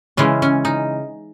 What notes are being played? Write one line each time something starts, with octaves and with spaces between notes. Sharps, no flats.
C#3 E3 G#3 C#4
C#4
D#4